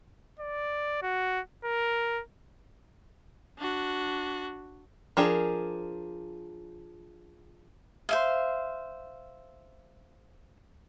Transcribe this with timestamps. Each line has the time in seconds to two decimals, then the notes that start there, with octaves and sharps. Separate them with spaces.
0.39 D5
1.02 F#4
1.65 A#4
3.59 D4 F#4
5.17 F3 D4 G#4 A#4
8.09 C5 E5 F5